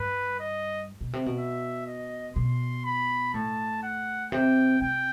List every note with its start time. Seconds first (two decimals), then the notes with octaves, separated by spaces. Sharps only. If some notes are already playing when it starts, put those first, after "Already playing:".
Already playing: G2 B4
0.40 D#5
1.01 B2
1.13 C3
1.26 B2
1.38 E5
1.87 D#5
2.36 B2 C6
2.85 B5
3.34 A2 A5
3.83 F#5
4.32 C3 G5
4.81 C3 G5